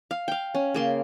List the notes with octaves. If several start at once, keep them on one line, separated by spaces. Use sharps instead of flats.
F5
F5 G5
C#4
C#3 A#3 C6